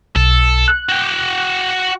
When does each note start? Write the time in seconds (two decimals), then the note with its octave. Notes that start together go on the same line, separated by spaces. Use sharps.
0.16 B1 A4
0.68 F#6
0.89 F#4 G5